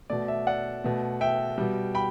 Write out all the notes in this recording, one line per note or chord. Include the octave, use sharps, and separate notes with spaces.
B2 A3 D5
E5
D5 F#5
B2 A3
E5 G5
B2 G3
G5 B5